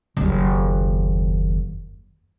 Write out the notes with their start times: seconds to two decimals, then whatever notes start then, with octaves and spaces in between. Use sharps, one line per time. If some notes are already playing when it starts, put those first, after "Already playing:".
0.17 F#1 D#2